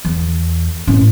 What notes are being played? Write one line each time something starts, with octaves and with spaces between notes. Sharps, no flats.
E2
A2 C#4